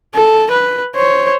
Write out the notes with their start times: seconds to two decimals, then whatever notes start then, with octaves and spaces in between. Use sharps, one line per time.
0.15 A4
0.51 B4
0.95 C5 C#5